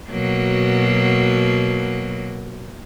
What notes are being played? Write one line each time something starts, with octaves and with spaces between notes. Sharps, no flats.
B2 F#3 A#3